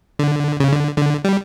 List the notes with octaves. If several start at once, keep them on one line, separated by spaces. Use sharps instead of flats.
D3
C#3
D3
D3
G3